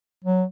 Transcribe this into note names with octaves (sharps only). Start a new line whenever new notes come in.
F#3